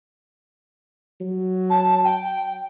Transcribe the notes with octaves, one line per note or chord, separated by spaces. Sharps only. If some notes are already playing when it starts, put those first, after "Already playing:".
F#3
A5
G5